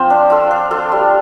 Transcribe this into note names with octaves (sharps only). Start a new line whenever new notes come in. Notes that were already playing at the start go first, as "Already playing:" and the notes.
Already playing: F3 C4 F4 C5
D4
F4 A4
D4
F4 A4
G3